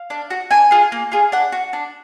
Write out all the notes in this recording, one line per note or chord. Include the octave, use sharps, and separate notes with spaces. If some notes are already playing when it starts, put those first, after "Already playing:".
Already playing: F5
D4
F#4
D4 G#5
F4 G#4
A#3
F4 G#4
D4 F#5
F#4
D4